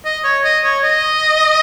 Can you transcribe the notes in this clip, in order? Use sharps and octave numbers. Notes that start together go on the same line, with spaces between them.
D#5
C#5
D#5
C#5
D#5